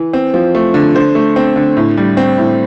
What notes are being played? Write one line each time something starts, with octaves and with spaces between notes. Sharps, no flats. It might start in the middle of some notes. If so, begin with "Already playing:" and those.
Already playing: E3
C4
F3
A3
D3
D3 C5
A3
C4
D3
A2
G3
C4
A2